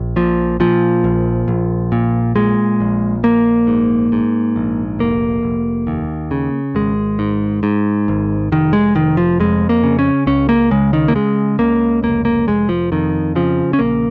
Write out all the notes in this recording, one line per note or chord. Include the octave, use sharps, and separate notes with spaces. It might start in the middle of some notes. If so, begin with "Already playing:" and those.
Already playing: A#1
A#2 F3
A#2 F3
A#1
A#1
A#2
A#2 G#3
A#1
A#1 A#3
G#2
G#2
A#1
F1 A#3
F1
D#2
C#3
G#1 G#3
G#2
G#2
G#1
F1 D#3
G#3
F1 D#3
F3
F2 G#3
A#3
C#3
C#4
C#2 C#4
A#3
C#3 G#3
D#3
A#3
C#3 G#3
C#2 A#3
F1 A#3
A#3
F1 G#3
F3
F2 D#3
C#3 F3
C#4
A#1 A#3